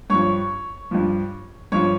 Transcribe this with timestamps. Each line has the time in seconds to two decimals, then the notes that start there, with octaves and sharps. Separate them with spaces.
0.10 G2 F3 C#5 C#6
0.91 G2 F3
1.72 G2 F3 C#5 C#6